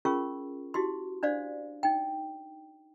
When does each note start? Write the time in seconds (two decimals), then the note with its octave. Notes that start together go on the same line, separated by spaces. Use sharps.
0.05 C#4 F4 G#4 A#4 C#6
0.74 E4 F#4 G4 C6
1.23 D4 C5 D5 F5
1.83 D#4 G5